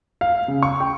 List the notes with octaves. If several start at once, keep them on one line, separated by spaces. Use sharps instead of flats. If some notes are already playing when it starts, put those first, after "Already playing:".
F5
C#3
C#6
G5